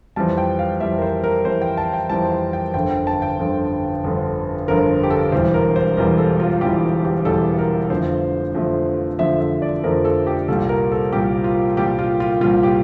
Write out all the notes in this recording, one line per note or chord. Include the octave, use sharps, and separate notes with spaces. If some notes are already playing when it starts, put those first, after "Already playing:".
F2 E3 G3 A5
G5
F5
F2 E3 G3 E5
A#4
C5
A#4
F2 E3 G3 C5
G5
A5
G5
F2 E3 G3 A5
G5
G5
G1 F2 D3 G5
G5
A5
G5
G1 F2 D3
G1 F2 D3
G1 F2 D3 A#4
G4
A4
E1 E2 E3 G3 C5
A#4
C5
E1 E2 E3 G3 A#4
A4
F4
E1 E2 E3 G3 G4
G4
E1 E2 E3 G3 A4
A#4
F2 D3 F3 A3 C5
F2 D3 F3 A3
F2 D3 F3 A3 E5
E5
D5
F2 D3 F3 A3 A#4
A4
G4
C2 A#2 G3 A4
A#4
A4
C2 A#2 G3 G4
F4
C2 A#2 G3 G4
F4
F4
C2 A#2 G3 F4
G4